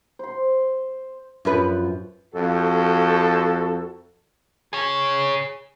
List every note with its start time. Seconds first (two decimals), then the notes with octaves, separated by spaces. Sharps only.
0.19 C5 C6
1.45 F#2 F3 B4
2.33 F2 F#4 A4
4.73 G#4 C#5